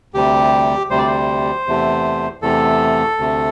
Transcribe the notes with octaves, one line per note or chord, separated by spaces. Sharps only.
D2 C3 G3 G4
D2 C3 G3 C5
D5
C5
E2 C3 A3
E2 C3 A3 A4
D2 C3 A3